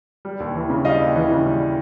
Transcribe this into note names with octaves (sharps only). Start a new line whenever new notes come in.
G3
D#2
E3
C#3
G3 D#5 F5
D#2
E3
C#3
G3